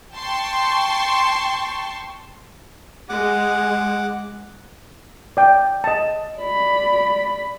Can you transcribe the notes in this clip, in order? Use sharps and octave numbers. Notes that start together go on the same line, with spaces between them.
G5 A5 C6 C#6
G#3 F#5 D6
D5 G5
D#5 A5
D5 B5